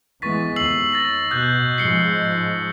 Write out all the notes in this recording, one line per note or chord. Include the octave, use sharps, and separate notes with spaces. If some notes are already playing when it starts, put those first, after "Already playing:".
E3 G#3 B3 C#6 A6 B6
D#2 E6 C7 F#7
A6 A#6 F#7
B2 D#6 F#6 G6
G#2 F3 G#3 C7 C#7 G7
C7